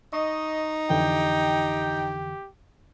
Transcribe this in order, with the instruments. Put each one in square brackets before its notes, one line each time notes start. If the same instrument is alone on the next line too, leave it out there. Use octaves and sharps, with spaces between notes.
[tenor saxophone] D#4 [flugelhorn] D#5 [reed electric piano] C#6
[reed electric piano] F2 D3 E3 [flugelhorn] G4 [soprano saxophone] G5